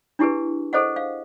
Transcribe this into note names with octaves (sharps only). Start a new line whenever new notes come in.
D4 E4 G4 G#4 B4
G#4 A4 C5 D#5 F#5
F5